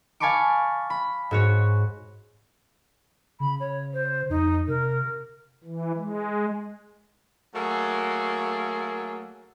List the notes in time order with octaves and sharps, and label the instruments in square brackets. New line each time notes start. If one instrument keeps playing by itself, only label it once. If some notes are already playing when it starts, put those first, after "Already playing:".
[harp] F5 G#5 A5 B5 C#6 D6
B5
G#2 F#4 C#5
[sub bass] C#3 [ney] B5
[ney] C#5
C5
[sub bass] F2 [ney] D#4
[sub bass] C3 [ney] A#4
[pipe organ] E3
G#3
[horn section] F#3 A3 A#3 G#4 A4